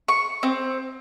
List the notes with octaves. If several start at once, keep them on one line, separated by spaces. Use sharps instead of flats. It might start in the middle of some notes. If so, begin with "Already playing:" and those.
C#6
C4